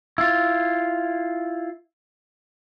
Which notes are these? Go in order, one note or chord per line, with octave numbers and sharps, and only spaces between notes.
E4 F4